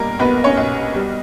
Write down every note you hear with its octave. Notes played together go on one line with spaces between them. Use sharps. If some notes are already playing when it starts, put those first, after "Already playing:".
Already playing: B1 G3 A#3 A#4
B1 B3 B4
C#4 C#5
B1
G3